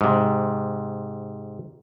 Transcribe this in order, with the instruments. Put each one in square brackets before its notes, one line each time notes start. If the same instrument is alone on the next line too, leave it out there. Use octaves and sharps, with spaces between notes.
[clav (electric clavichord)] G#2 C3